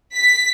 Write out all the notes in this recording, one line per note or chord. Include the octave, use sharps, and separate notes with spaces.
B6